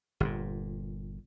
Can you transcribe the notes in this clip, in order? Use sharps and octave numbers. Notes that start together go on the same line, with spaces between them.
G1 A#2